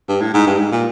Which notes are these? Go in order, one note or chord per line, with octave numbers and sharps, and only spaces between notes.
G2
A2
G#2
G2
G#2
A#2